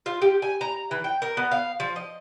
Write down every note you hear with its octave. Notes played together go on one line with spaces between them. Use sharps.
F4
G4
G#5
A#5
E3
G5
A#4
B3
F5
F3
D#5